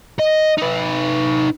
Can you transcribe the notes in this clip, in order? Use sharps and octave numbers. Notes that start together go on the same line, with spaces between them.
D#5
D#4 B4